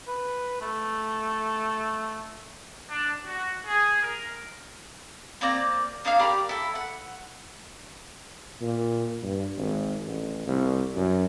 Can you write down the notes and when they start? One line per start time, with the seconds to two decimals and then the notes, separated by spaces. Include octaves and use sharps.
0.08 B4
0.61 A3
2.90 D4
3.24 F#4
3.66 G#4
4.03 A#4
5.41 A#3 C4 D5 A#5
6.05 A#3 D4 D#4 F5
6.19 G4 A#4 D5 B5
6.49 E4 A4
6.75 F#5
8.62 A#2
9.23 G2
9.57 G#1
10.06 A1
10.47 C2
10.96 F#2